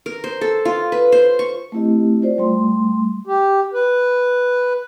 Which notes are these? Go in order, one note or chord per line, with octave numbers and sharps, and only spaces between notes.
A#4
C5
A4
F4
B4
C5
C#6
A3 C4 E4 G4 D#5
F4 C5 D5
G3 A3 C6
G4
B4